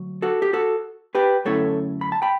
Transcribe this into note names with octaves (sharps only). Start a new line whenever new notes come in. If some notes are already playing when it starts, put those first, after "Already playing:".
Already playing: D2 F#3
F#4 A4
G4
F#4 A4
G4 B4
F#2 D3 A3 C#4 E4 A4 C#5
B5
A5
G5 B5